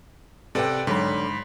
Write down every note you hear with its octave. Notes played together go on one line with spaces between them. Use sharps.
C3 A4 B4 D5 F#5 G5
G#2 D3 F#3 B5